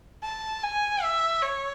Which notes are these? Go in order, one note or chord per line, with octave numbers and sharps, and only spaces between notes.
A5
G#5
E5
C#5